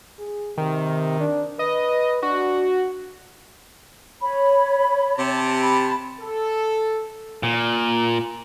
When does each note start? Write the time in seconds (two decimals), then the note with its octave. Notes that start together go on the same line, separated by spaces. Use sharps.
0.19 G#4
0.58 C3 D#3
1.20 D4
1.59 B4 D#5
2.23 D4 F#4
4.22 C#5 B5
5.17 C3 A5
5.63 B5
6.21 A4
7.43 A#2